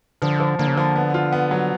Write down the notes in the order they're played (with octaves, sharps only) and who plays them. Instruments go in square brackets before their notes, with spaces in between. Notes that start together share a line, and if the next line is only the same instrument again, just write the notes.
[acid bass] D3 [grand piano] F3
[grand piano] F3
[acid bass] D3 [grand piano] A#3
[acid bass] C#3
[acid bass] D3 [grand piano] F3
[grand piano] B3
F4
B3
F#3